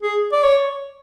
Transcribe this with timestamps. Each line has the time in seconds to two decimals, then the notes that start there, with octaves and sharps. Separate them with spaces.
0.03 G#4
0.33 D5
0.43 C#5